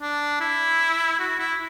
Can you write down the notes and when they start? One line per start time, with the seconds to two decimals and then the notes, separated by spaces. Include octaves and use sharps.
0.01 D4
0.41 E4
1.20 F#4
1.40 E4